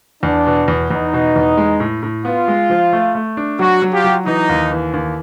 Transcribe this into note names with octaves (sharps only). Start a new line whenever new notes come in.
E2 D4
B2
E2
E2 D#4
B2
E2
G#3
A2
A2
B3 F4
G#3
F3
A3
A3
D4
F#3 F#4
F#3
F4 G4
F#3
E3 D#4
D#2
E3
D#2